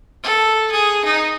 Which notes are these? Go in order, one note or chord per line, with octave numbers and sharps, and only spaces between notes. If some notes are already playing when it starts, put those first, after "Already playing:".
A4
G#4
D#4